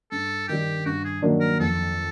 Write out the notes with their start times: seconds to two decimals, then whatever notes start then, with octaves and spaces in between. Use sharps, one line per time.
0.12 G2 A4
0.48 D#3 G3 G4
0.86 G2 F#4
1.05 G#4
1.22 D#3 F#3 A#3 D4
1.40 A#4
1.60 F2 A4